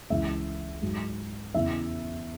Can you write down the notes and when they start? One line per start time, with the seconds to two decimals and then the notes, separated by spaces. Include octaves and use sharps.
0.10 C#2 C#3 E3 E5
0.82 G#2 F#3
1.54 E2 C#3 E3 E5